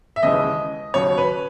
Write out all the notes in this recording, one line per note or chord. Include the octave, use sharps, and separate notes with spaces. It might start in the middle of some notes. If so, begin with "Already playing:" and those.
E5
D#2 C#3 E3 G#3 D#5
D#2 C#3 F#3 C#5
B4